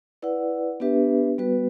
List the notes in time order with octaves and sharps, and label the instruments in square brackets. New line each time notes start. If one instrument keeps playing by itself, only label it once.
[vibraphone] E4 B4 D5 F#5
B3 D4 G4 B4 E5
G3 B3 F#4 B4